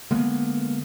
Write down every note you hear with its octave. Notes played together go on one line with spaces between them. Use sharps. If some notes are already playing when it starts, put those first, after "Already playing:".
D3 G#3 A#3 B3